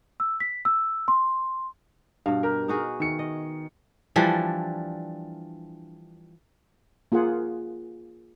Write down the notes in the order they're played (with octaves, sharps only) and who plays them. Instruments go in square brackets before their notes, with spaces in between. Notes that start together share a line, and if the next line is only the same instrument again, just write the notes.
[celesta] E6
B6
E6
C6
[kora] G2 B2 [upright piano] F5
[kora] G4 [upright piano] A#4
[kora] D#4 F#4 G#4
[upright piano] D#3 C#7 [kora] E5
[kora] D#5
E3 F3 G3 D4
[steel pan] A#3 F4 G#4 F#5